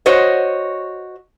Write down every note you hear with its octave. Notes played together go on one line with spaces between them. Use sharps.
F#4 C5 C#5 D#5